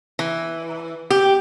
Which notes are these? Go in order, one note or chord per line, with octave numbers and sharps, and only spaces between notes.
E3
G4